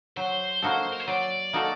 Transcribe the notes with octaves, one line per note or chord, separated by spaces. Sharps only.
F#3 C5
A#3 D#4 F#4 A4
A#4
C5
F#3 D5
A#3 D#4 F#4 A4